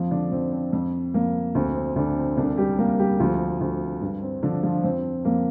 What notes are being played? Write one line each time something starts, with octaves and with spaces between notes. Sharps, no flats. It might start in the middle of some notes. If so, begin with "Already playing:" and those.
Already playing: F2 F3 F4
D3 D4
F2 C4
C4
F2
F2 A#3
D2 C4
C4
D2 D3 D4
C4
C2 D3 D4
G3 G4
C2 A#3 A#4
G3 G4
D2 F3 F4
D2
G2
C4
D3 F3 D4
F3 F4
F2 C4
F2 A#3